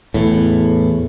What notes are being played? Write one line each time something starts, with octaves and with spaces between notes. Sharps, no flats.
E2 A2